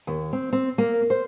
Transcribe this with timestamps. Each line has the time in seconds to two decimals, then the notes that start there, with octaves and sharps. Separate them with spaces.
0.07 D#2
0.33 C4
0.53 C4
0.78 A#3
1.10 C5